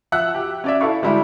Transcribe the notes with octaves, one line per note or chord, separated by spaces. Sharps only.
F3 E5 F#5 E6 F#6
G4
C#4 D5 E5
E4 A4 F5 C#6
D2 G3 G#3 E4 G4